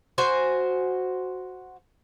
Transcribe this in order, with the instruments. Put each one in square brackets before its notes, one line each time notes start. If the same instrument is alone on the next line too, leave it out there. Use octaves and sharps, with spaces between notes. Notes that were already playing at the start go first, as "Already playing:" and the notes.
[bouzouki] F#4 C5 G#5